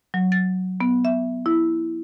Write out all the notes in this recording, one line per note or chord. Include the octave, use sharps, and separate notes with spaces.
F#3
A6
B3
E5
E4